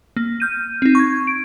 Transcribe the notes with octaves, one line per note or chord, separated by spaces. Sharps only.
A#3
F6 G6 D#7
C4 D#4
C#6 G#6
D7